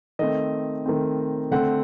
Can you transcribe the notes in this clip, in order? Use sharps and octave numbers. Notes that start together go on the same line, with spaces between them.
D#3 A3 C4 D#5
D#3 A3 C4
D3 A3 C4 F#5